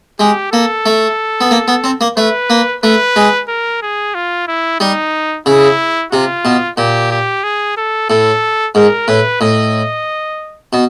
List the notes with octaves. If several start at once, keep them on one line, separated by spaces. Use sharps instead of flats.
G#3 G4
A#3 A4
A3
B3
A#3
B3
C4
A#3
A3 B4
A#3
A3 B4
G#3
A#4
G#4
F4
E4
G3 D#4
C#3 E4
C3 F4
B2
A#2 G4
G4
G#4
A4
A2 A4
G#2 A#4
A2 B4
A2 D#5
B2